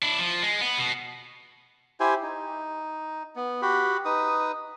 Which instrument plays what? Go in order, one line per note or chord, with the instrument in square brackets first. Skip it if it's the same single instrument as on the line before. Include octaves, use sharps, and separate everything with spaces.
[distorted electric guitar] D4 E4
F3
G#3
B3
B2
[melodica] E4 G4 C5 G#5
D#4
B3
F#4 G4 B5
D#4 B4 D#6